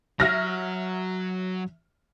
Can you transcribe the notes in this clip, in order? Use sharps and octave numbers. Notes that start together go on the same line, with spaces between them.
F#3 E5 F6 A#6